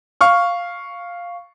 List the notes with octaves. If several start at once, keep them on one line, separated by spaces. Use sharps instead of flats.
F5 C#6 F6